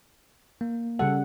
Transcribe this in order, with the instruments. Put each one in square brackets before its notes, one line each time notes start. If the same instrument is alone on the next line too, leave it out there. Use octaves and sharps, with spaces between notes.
[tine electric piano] A#3
[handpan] C#3 G3 F#5 [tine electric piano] A4